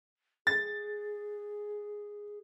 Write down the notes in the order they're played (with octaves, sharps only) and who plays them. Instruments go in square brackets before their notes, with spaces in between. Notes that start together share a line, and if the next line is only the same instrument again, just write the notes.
[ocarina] G#4 [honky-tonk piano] A6